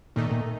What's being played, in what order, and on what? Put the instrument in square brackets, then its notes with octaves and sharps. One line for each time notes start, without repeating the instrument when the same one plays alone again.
[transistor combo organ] A#2 [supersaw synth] D#3 A3 D#4
[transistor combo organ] A#2